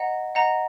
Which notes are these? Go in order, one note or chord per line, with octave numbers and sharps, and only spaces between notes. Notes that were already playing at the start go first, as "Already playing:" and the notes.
Already playing: D#5 F#5 A#5
D#5 F#5 A#5